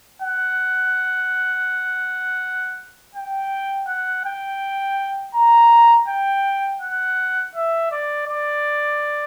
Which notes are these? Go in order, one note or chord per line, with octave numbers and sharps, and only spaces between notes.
F#5
G5
F#5
G5
A#5
G5
F#5
E5
D5
D5